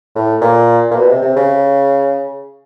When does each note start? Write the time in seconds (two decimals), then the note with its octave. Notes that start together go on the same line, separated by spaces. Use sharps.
0.15 A2
0.41 A#2
0.91 A#2
0.96 B2
1.09 C3
1.22 C3
1.36 C#3